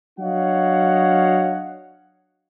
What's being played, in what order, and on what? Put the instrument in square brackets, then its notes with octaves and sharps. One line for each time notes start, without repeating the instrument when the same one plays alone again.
[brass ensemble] F#3 D4 C#5 D#5 F5 F#5